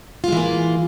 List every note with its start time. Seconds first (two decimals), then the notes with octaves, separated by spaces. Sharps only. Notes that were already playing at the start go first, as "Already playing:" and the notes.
0.24 F4
0.28 G#3
0.32 E3
0.37 A#3